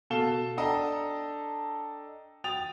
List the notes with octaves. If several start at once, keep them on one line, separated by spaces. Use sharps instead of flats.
B2 A4 F5 E7 G7
D4 A4 D#5 G5 A#5
G5 D#6 A6 F7